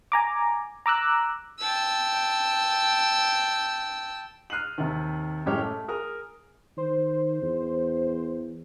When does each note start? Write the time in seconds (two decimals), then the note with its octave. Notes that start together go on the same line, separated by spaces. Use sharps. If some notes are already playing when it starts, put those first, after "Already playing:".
0.12 G#5 A#5 D6
0.86 A#5 D6 E6 F#6
1.59 G5 A5 E6
4.50 F6 F#6 C7 D#7 F#7
4.78 D#2 C3
5.46 F#2 A2 G#3 G4 C#5 F6
5.62 A3
5.88 G#4 A#4 D#6 F6
6.78 D#3 C5
7.42 E2